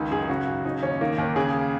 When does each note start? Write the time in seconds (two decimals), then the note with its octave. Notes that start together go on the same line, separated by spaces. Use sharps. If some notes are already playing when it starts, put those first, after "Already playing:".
Already playing: C#2 D#3
0.11 F#2 G#4
0.29 C#3 F#4
0.47 F#2
0.65 C#3 D#4
0.83 D#2 C#4
1.01 D#3 A#3
1.18 D#2
1.36 C#3 G#4